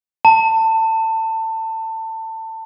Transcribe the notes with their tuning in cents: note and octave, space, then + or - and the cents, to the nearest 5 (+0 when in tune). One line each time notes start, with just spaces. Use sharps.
A5 +25